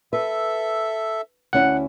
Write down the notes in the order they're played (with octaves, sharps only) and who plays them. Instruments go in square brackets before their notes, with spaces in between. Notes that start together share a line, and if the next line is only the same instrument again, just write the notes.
[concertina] A4 E5 [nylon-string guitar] B4
[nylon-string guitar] D2 C#4 E4 [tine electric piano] F#5